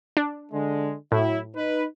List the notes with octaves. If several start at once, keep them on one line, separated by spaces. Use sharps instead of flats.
D4
D3 G#3
A2 F#3 E4
D#4 B4